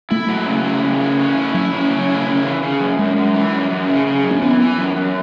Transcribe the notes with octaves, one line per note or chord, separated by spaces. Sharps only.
A3 E4
F#3
C#3
E4
C#3
E4
C#4
E4
F#3 E4
C#4
C#3
E4
C#3
E3
C#3
F#2
F#2 G#3
F#2
E3
F#2
F#2
C#3
C#3
F#2
C#4
E3 B3
E3
F#2
F#2